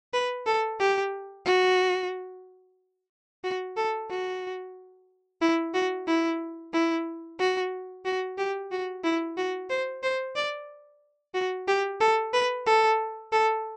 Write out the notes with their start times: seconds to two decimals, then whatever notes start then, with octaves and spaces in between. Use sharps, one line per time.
0.14 B4
0.47 A4
0.80 G4
1.46 F#4
3.44 F#4
3.77 A4
4.10 F#4
5.41 E4
5.74 F#4
6.08 E4
6.74 E4
7.39 F#4
8.05 F#4
8.38 G4
8.72 F#4
9.04 E4
9.37 F#4
9.70 C5
10.03 C5
10.36 D5
11.34 F#4
11.68 G4
12.01 A4
12.33 B4
12.67 A4
13.32 A4